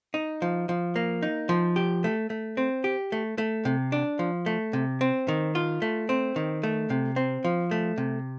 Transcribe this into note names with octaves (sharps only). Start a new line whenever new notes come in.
D#4
F3
F3
A#3
D#4
F3
G4
A3
A3
C4
G4
A3
A3
C3
D4
F3
A3
C3
C4
D#3
F4
A3
C4
D#3
A3
C3
C4
F3
A3
C3